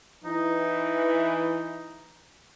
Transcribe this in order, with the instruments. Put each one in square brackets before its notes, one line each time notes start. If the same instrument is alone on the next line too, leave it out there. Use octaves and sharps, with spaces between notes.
[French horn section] E3 [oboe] D#4